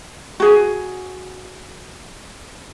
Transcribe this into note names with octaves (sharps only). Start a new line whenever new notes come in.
F#4 G#4